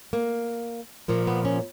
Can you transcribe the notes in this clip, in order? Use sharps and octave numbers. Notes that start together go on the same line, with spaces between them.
A#3
A#2 F3 A#3
B3
C#4